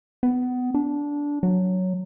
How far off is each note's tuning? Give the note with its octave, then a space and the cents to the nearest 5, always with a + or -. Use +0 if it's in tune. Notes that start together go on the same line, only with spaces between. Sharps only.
B3 +20
D4 -15
F#3 +0